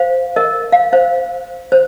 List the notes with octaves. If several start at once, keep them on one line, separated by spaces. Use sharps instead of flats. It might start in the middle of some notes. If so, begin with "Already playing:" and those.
Already playing: C5 F5
A#4 D#5
F5
C5 F5
C5